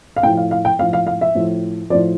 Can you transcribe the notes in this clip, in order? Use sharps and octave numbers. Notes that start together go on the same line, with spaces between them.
F5
A2 F3 G5
F5
F5
G5
A2 F3 F5
F5
F5
E5
A2 F3
A2 F3 D5